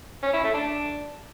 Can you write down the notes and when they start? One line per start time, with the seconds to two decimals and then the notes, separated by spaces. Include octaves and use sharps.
0.22 C#4
0.33 E4
0.44 A3
0.54 D4